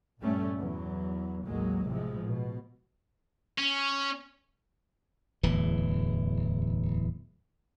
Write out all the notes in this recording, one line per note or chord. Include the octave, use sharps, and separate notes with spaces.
G2 A#2 G3 A3 C#4
E2 F#3
A1 D#2 F#3 G#3 A#3
A2 C3 F3 G#3
B2
C#4
D1 E2 E3